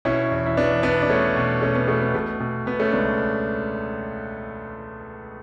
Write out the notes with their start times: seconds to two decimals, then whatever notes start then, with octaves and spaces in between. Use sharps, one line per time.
0.05 B2 C#4 E4
0.32 E2
0.46 E4
0.57 E2 B3 D4
0.83 B2 B3 D4
1.02 D4
1.09 B2 A3 C#4
1.36 B2
1.62 B2 A3 C#4
1.75 B3
1.87 B2 A3
2.01 B3
2.15 B2 A3
2.40 B2
2.66 B2 B3
2.80 A3 C#4
2.92 C#2 B3 D4